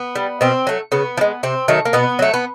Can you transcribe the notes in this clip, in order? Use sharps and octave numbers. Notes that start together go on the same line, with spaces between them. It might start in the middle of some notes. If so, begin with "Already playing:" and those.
Already playing: B3
G3
B2 C4
F#3 A3
C#3 B3
F3
G#3
C3 C4
D#3 F#3 A3
A#3
B2 B3
F#3 A3
B3